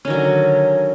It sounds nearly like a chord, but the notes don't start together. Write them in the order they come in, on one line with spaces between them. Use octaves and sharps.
C#4 D#3 F#3 D3